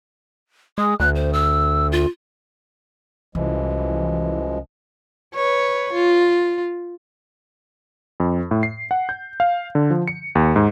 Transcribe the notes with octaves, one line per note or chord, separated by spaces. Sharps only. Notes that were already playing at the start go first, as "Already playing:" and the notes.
G#3 D#6
D2 F#6
C5
E6
F4
C2 F#2 E3 F3 G#3
B4 C#5
F4
F2
A2
C7
F#5
G6
F5
D3
F3
C#7
D#2
G#2